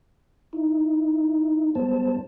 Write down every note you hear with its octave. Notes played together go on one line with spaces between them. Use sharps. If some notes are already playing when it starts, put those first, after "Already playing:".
D#4 E4
F#2 G3 G#3 B3 C5 A5